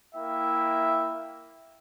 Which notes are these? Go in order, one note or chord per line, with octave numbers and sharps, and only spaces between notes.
A#3 E4 E5 G5